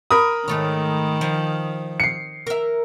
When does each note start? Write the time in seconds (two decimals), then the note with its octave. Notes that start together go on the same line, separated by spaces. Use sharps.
0.11 A#4 B5 D#6
0.48 G#2 D#3 A3 C#5
1.21 F3
2.00 C7 C#7
2.47 A#4 E5